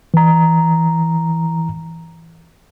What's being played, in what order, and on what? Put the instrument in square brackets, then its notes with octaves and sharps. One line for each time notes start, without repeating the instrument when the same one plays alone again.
[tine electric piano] E3 A#5